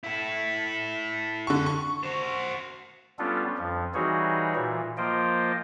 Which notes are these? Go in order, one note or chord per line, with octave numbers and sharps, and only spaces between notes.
E4 A4
D3 C#6
C#6
F#4 C5
G3 B3 C#4 D4 F4 A4
F2 F3
E3 G3 D#4 F#4 G#4 C#5
A#2 E3
F3 A#3 F4 C5 D#5 G5